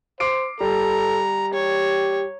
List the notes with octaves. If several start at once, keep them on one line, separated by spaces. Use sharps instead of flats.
C5 D6 C7 D7
G3 A4 A#5
G4 C#5